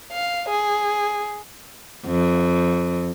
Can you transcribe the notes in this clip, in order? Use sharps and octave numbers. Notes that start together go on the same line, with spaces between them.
F5
G#4
F2